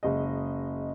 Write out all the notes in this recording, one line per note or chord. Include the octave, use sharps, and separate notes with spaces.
F#1 G#3 D#5